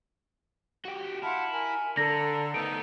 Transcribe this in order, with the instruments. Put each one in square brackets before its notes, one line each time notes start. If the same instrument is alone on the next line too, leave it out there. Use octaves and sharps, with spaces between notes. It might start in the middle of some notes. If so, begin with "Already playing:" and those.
[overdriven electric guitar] F#4 G4
[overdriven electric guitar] E4 [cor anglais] F5 [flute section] F#5 A5 C6
[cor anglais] A#4 [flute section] G#5
[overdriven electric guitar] D3 [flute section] A4 A#5 [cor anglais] D5 [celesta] A#6
[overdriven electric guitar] A3 B3 [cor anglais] D#4 [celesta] D7